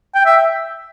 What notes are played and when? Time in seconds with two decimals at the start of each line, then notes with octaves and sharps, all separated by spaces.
0.15 G5
0.26 E5